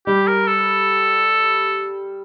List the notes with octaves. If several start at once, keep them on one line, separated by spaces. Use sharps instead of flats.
G3 G4
A#4
A4